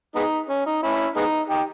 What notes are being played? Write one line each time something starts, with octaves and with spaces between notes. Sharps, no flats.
G#3 B3 D#4
C#4
D#4
C#4 E4
G#3 B3 D#4
D#4 G4